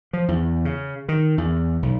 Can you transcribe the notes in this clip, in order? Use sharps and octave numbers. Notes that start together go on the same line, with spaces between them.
F3
E2
C#3
D#3
E2
B1